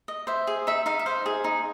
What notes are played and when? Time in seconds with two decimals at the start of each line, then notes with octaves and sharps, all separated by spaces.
0.08 D#5
0.27 C5 E5
0.47 G#4
0.67 D#4 E5
0.86 D#4 F5
0.99 E5
1.06 C5 F5
1.26 G#4
1.44 D#4